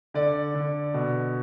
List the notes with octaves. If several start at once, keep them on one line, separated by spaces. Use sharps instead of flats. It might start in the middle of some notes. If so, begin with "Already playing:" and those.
D3 D5
D3
B2